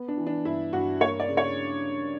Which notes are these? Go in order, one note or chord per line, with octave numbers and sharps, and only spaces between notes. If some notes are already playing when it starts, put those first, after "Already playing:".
Already playing: B3
D4
E3
D4
G2 E4
G2 F#4
A#3 C#5
D5
C#3
C#5